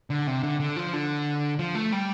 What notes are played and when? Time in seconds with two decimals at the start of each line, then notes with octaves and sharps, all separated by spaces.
0.10 D3
0.27 C3
0.43 D3
0.60 D3
0.76 F3
0.93 D3
1.59 F3
1.75 A3
1.92 G3